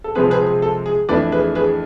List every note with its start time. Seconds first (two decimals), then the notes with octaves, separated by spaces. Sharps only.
0.04 A4
0.15 C3 F3 G#3 C4 G#4 B4
0.31 G#4 B4
0.47 G#4
0.62 A4
0.86 G#4
1.09 F2 E3 A3 D4 B4 D5
1.32 G#4 B4
1.55 G#4 B4